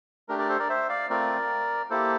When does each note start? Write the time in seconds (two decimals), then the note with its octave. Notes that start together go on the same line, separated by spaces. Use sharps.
0.29 A3 D4 G4 A#4
0.39 A#4 D5
0.49 A4 C5
0.59 A#4 D5
0.69 C5 E5
0.89 D5 F5
1.10 A3 C4 F4 A#4 D5
1.90 A#3 E4 G4 A4 C5